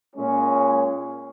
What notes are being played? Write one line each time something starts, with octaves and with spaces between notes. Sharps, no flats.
A#2 G#3 C#4